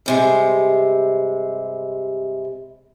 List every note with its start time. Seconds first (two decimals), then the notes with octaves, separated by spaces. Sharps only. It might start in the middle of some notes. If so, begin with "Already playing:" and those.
0.06 G2 C3 G#3